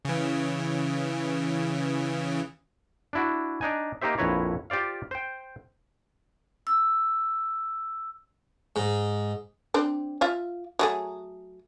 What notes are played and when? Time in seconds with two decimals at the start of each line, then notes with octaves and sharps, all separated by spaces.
0.05 C#3 E3
3.13 D4 E4 F#4
3.61 D4 D#4 G#5
4.02 A#3 D#4 G4 C5 E5
4.18 A#1 F2 E4 B4 C#5 A#5
4.70 F4 G4 C5 D5 F5
5.11 C5 G5
6.67 E6
8.76 G#2
9.74 C4 D4 C5
10.21 F4 E5 F5
10.79 F#3 A3 G#4